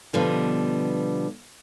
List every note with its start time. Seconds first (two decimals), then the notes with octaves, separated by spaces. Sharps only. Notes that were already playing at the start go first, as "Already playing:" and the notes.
0.13 B2 D3 F3 G3 B3